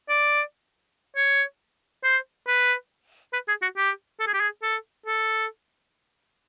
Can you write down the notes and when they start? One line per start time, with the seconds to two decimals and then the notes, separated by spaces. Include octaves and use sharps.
0.09 D5
1.16 C#5
2.04 C5
2.47 B4
3.33 B4
3.48 G#4
3.62 F#4
3.77 G4
4.20 A4
4.27 G#4
4.34 G4
4.41 G#4
4.63 A4
5.06 A4